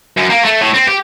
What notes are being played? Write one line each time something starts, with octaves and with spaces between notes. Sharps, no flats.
F#2
A#3
A3
A2
C4
G4